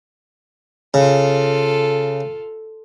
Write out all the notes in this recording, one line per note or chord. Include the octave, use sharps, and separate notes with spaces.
C#3 F4 A4